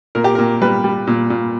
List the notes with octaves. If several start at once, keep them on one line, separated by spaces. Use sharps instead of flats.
A#2 A#4
G4
A#2 A#4
G3 B4
G3
A#2
A#2